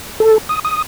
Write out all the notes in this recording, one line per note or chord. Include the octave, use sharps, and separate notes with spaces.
A4
D#6
D#6